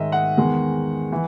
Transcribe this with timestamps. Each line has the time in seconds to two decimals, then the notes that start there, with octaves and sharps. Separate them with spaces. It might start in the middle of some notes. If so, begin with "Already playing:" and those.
Already playing: G#2 D#3 G#3 D#5 E5
0.12 F#5
0.37 E2 D#3 G#3
1.12 E3